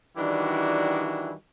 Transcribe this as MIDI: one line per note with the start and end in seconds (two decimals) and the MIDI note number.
0.17 1.33 51
0.17 1.33 52
0.17 1.33 55
0.17 1.33 62
0.17 1.33 64
0.17 1.33 66